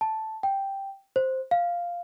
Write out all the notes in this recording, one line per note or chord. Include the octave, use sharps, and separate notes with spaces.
A5
G5
C5
F5